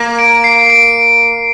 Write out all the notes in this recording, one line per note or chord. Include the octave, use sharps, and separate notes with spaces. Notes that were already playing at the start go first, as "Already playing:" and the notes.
Already playing: A#3
D7
C7
D7